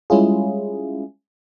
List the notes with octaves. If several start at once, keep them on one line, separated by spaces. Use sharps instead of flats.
G3 G#3 C#4 E4 F4 G#4